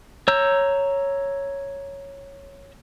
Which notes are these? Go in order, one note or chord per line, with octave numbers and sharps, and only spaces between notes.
C#5 A#5 E6 G6